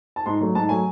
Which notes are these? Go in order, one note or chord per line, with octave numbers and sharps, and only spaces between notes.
A5
G#2 C6
F#3 A3
G#2 A5
F#3 A3 G#5